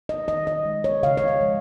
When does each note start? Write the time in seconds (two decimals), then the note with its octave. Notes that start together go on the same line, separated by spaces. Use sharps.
0.09 D#5
0.28 D#3 D#5
0.47 D#5
0.65 G#3
0.84 C#5
1.03 C#3 F5
1.17 C#5
1.28 D#5
1.41 F3 G#3